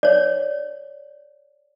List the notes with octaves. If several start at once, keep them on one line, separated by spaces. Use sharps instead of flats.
C#5 D5